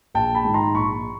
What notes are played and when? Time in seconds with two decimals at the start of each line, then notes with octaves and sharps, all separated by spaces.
0.14 A#1 G5 A5
0.35 A5 B5
0.44 G#2 D#3
0.54 A#5 C6
0.74 A#1 B5 C#6